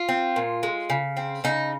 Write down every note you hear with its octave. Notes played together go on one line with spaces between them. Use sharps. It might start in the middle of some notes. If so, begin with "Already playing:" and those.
Already playing: F4
C4
A#2
G#3
C#3
C4
C#3 D#4